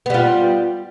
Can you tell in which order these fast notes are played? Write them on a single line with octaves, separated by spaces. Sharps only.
B3 G3 F4